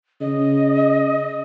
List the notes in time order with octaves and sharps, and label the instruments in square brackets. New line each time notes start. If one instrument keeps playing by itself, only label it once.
[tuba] C#3 [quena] D#5